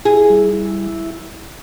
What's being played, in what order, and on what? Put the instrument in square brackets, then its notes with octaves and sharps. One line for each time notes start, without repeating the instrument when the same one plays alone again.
[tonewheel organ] E4 [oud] G#4
[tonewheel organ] G3
E4